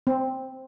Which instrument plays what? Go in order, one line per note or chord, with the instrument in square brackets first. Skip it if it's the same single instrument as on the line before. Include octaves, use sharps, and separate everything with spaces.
[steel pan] C4